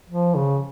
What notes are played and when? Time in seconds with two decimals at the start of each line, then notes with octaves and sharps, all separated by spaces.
0.09 F3
0.36 C#3